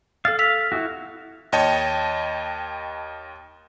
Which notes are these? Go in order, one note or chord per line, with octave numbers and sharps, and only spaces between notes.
A4 F5 A6
F5 E6 B6 F7
E4 F#4
D#2 C#5 D#5 G5 A5